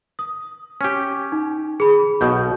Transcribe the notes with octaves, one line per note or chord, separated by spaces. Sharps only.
D#6
C#4 G4
D#4
G#4 B5
B1 B2 G6